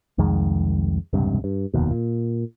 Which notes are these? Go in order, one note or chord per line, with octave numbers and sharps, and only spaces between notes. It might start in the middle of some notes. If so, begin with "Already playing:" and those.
C2 F2 D#3 G#3
E1 C#2 G2 C3
G2
F1 D#2 B2
A#2